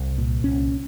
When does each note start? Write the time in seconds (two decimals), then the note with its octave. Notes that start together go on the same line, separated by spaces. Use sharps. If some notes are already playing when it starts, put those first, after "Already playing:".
Already playing: C2
0.18 A#2
0.44 C2 C#4